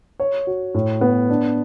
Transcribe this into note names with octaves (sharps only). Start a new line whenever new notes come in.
C#5
F#4
A2
B3
D4